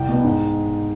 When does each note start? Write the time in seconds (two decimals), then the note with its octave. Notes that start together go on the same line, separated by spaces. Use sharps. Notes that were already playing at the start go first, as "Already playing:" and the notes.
Already playing: C2 G5
0.09 B2 B3
0.24 G#2